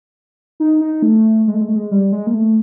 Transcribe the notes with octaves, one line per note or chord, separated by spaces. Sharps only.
D#4
D#4
A3
G#3
A3
G#3
A3
G#3
G3
G#3
A#3
A3